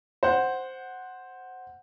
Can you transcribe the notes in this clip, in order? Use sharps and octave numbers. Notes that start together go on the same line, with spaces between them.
C5 F#5